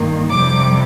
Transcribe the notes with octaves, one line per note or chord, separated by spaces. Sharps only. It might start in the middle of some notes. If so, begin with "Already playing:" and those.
Already playing: G2 D#3 A#3
F2 C3 G3 D6